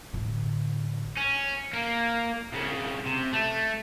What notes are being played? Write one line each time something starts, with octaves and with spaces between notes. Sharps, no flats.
A1 D3
C#4
A#3
C2 C#3
C3
A3